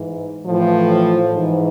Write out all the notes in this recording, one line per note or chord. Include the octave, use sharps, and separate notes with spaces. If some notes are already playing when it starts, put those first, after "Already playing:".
Already playing: G#2 E3
A2 E3 F3
G#2 E3